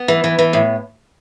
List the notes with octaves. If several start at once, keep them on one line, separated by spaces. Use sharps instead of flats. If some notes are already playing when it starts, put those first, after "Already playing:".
Already playing: B3
E3
E3
E3
A2